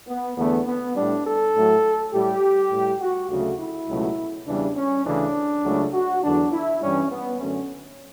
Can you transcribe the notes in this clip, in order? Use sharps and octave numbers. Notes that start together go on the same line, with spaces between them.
B3
E2 D3 A3 B3
B3
A2 G3 D4
A4
A2 F#3 A3
A2 G3 G4
A2 G3
F#4
D2 C#3 F#3 A3 F#4
E4
C#2 B2 F#3 A3
E2 C#3 E3 G3 D4
C#4
D2 C#3 E3 A3 D4
C#2 C#3 F#3 A3
F#4
E2 D3 F#3 D4
E4
G2 E3 G3 C#4
B3
F#2 D3 A3 C#4